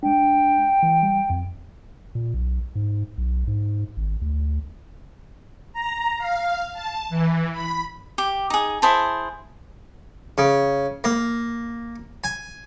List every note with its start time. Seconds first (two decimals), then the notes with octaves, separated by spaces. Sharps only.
0.03 G#3 D4 G5
0.83 E3
1.03 G3
1.30 F2
2.15 A#2
2.34 B1
2.75 G#2
3.18 B1
3.48 G#2
3.97 G#1
4.22 D2
5.73 A#5
6.18 F5
6.73 A5
7.10 E3
7.52 B5
8.18 G4
8.50 D#4 G#4
8.82 E4 G#4 C5 A5
10.38 C#3
11.04 A#3
12.24 G#5